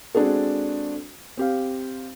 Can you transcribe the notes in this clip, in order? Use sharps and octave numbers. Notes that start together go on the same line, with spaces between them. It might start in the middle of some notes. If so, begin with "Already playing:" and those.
G#3 C4 D4 F#4 G#4 A4
C4 G4 F5